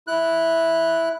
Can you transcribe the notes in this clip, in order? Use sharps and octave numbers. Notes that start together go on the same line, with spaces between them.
E4 F#6